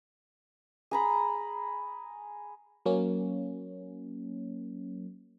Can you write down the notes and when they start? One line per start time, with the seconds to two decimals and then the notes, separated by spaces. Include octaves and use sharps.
0.91 G#4 A#5 B5
2.86 F#3 A#3 C#4